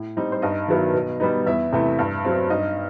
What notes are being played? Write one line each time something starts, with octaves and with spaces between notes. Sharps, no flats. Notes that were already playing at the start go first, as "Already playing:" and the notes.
Already playing: A2
G3 C4 D#4
C5
G2 D#4 D#5
D#3 F#3 B3 E4
B2
G3 B3 D#4
E2 E4 E5
C3 E3 A3 E4
G2
F#3 C4
G2 D#4 D#5